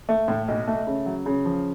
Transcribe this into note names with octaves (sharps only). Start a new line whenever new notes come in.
A3
A2
B1
A3
C#3
F#3
C#3
F3